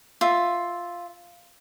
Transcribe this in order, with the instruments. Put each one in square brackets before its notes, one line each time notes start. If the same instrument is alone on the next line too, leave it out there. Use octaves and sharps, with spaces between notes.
[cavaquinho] F4 E5